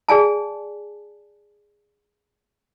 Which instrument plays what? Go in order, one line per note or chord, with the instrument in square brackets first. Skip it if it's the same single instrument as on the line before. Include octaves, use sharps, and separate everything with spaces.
[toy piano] G#4 D5 G#5 A5